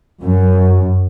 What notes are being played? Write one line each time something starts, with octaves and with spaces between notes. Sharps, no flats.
F#2